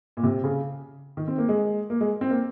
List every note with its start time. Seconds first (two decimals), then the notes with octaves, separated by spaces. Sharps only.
0.17 A#2
0.23 C3
0.44 C#3
1.17 D#3
1.28 C4
1.38 A#3
1.49 G#3
1.90 A#3
2.01 G#3
2.21 C4
2.31 A#3